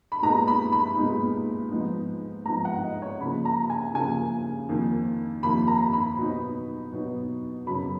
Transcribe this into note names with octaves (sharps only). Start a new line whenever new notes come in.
B5
A#2 G#3 B3 D#4 A#5
B5
B5
A#2 G#3 B3 D#4
G#2 F3 B3 D#4
G#2 F3 B3 D#4 A#5
F#5
D#5
C#5
C#3 F3 A#3 B5
A#5
G#5
C#3 F3 A#3 G#5
F2 D#3 A#3
F2 D#3 A#3 B5
A#5
B5
B2 F#3 B3 D#4
B2 F#3 B3 D#4
F#2 C#3 F#3 B3 B5